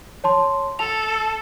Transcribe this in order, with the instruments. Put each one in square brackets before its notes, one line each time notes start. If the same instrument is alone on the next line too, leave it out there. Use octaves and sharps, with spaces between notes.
[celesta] C#5 A5 C6
[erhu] A4 [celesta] A5 F7